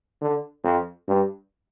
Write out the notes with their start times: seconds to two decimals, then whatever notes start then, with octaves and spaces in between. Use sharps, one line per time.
0.22 D3
0.64 F2
1.08 G2